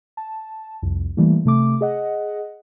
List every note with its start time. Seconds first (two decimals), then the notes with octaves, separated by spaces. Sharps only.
0.17 A5
0.82 C2 F2
1.17 E3 G3 A3 A#3
1.45 C3 A3 D6
1.81 G#4 D#5 F#5